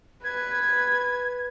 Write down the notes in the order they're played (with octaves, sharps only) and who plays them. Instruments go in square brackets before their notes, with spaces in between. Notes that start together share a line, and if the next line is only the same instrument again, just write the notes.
[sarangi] B4 [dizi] G#6